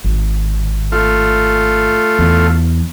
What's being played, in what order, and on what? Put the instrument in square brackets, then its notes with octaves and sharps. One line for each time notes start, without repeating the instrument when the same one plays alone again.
[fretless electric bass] G#1
[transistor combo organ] A3 F4
[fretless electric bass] E2